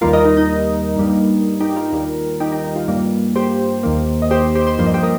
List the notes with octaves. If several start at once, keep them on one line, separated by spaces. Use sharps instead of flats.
D#2 D#3 G3 A#3 F4 A#4
A#4 D#5
D#4
D#4
G2 G3 A#3
D#4 G4
F4 A#4
D#2 D#3 G3
D#4 G4
D#4 G4
D#4
F4
G2 G3 A#3
G4 C5
D#2 D#3 A#3
D#5
G4 C5
G4 C5
G4 C5
G2 F3 A#3 C5
D#5
G4 C5
A#4 D#5